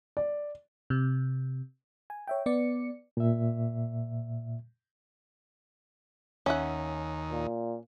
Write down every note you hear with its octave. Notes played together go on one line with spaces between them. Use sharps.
D5
C3
G#5
C#5 E5 G5
B3 D5 C#7
A#2 E5
D#2 C#4 E5 F#5
A#2